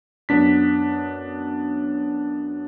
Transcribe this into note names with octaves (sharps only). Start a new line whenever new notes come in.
F#2 B3 D4 B6